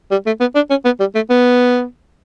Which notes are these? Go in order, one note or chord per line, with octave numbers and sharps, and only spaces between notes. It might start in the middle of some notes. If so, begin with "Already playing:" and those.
G3
A3
B3
D4
C#4
B3
G3
A3
B3